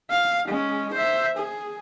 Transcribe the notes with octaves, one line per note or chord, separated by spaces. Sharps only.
F5
G#3 C#4
C5 E5
G#4